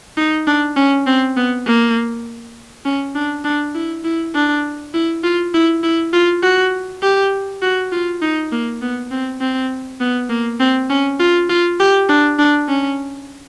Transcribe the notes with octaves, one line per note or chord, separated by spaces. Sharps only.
D#4
D4
C#4
C4
B3
A#3
C#4
D4
D4
E4
E4
D4
E4
F4
E4
E4
F4
F#4
G4
F#4
F4
D#4
A#3
B3
C4
C4
B3
A#3
C4
C#4
F4
F4
G4
D4
D4
C#4